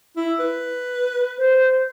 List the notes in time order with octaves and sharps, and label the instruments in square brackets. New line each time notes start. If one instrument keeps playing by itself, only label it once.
[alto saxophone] E4
B4
[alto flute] C5